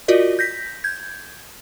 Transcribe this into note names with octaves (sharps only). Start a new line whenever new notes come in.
F4 F#4 A#4 D5 D#5
G6 A#6 B6
G6 G#6